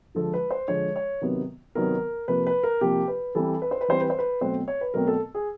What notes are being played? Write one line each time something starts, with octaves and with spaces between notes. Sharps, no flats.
D3 F3 G#3 A4
B4
C5
D3 F3 G#3 C#5
C#5
C3 D#3 F#3 B3
C3 D#3 F#3 B3 A#4
C3 F3 A#3 B4
B4
A#4
C3 F3 A#3 G4
B4
E3 G3 C4 A4
B4
C5
B4
E3 G3 C4 C5
B4
C5
B4
B2 F#3 A3 C4 C5
C#5
B4
B2 F#3 A3 C4 A#4
A4
G#4